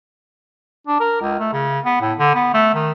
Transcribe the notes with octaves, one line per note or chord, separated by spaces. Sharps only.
D4
A#4
C#2
A3
C#3
B3
A2
D3
B3
A3
D#3